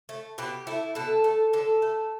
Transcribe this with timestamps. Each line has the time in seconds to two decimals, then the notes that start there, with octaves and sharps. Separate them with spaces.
0.09 A3
0.38 B2 G4
0.67 A3 E4
0.95 B2 A4
1.24 A3
1.53 D3 A4
1.82 A3